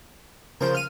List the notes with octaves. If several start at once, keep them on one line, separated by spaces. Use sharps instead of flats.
C#3 F3 A#4 C5 G6
F5 F6 D#7